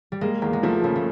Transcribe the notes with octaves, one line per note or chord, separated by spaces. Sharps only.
G3
G#3 A#3
E2 A#3
G#3
F3 A3
C#3 A3
A3